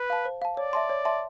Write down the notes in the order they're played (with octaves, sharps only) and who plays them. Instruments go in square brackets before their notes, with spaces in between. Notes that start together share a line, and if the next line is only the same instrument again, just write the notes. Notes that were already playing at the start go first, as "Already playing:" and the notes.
Already playing: [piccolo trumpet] B4
[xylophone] F5 A5
C5
F5 A5
[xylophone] C#5 [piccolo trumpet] D5
[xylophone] E5 A5 C6
C#5
E5 A5 C6